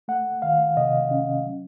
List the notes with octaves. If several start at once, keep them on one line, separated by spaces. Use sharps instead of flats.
A3 F#5
D#3 F5
C3 D#5
C#4
F#3